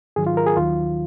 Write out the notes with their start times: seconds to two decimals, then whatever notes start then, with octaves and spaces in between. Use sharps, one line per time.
0.16 G#2 D#3 F#3 G#4
0.27 F4
0.37 A#4
0.46 G#4
0.57 D#2 D#3 F#3 F4